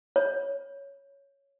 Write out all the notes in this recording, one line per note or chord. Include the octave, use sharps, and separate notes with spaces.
C#5